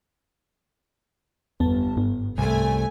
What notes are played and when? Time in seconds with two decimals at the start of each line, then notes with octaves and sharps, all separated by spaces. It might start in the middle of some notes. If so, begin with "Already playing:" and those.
1.60 G1 F2 B3 A5
1.97 G#2 B3
2.38 C2 A3 G#5